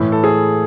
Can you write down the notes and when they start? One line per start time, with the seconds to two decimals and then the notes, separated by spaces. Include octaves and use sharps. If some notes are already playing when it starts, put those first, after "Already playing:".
Already playing: A2 E3
0.12 A4
0.24 G#4